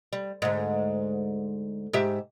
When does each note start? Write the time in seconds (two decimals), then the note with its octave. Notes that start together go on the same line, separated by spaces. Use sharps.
0.13 G3
0.42 D2 G#2
1.93 G#2 G4 E5